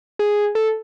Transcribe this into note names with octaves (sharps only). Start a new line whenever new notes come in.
G#4
A4